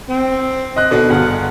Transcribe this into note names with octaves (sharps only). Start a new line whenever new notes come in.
C4
D#5 F#6
B2 D3 D#3 D4
G1 G#4 F5 F#5